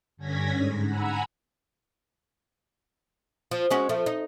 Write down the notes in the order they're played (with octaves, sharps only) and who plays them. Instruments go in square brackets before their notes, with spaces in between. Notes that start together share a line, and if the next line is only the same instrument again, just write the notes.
[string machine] G2 D3 C#4 G#6 A#6 B6
G#2
F#5 G#5 A#5 B5 E6
[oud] F3
G#3 C#4 F#4
F3 A3
D#4